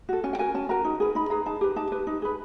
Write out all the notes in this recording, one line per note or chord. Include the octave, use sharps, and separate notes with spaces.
F#4 A4
C#4 G#5
G5
F#4 A#4 G#5
C#4 A5
F#4 A#4 A#5
D#4
G#4 B4
D#4 B5
G#4 B4 A#5
D#4 A5
G4 B4
D#4 A5
G4 B4
D#4
G#4 B4